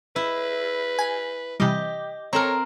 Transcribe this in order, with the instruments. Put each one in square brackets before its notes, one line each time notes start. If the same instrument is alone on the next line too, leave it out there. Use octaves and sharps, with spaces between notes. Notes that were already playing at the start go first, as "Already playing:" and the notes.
[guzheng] E4 [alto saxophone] B4
[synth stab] G#5
[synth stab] C3 E3 G3 [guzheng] G4 D#5
[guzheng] C4 A#4 [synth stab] A4 A#5 [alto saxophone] C#5